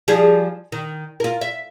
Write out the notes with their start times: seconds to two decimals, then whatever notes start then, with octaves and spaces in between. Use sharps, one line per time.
0.08 F3 G3 G#4
0.72 D#3
1.20 F4 A#4
1.41 E5